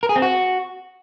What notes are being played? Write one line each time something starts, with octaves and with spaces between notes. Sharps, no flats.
A#4
G#4
C4
F#4